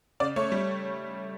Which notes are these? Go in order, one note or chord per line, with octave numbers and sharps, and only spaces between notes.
C#3 D5
A3 C#5
G3